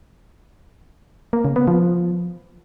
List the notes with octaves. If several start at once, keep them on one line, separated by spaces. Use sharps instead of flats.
A#3
C#3
B3
F3